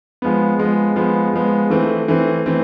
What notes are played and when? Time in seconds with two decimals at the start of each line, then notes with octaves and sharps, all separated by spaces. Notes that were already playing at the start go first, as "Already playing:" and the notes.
0.22 F3 G#3 B3
0.59 F3 G#3 B3
0.96 F3 G#3 B3
1.33 F3 G#3 B3
1.70 E3 A3 C4
2.08 E3 A3 C4
2.46 E3 A3 C4